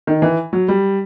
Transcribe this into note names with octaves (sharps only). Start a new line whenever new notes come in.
D#3
E3
F#3
G3